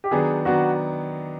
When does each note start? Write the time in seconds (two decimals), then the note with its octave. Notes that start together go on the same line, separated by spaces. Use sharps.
0.04 G4
0.11 D#3 F#3 B3 D4 G#4
0.45 D#3 F#3 B3 D4 F#4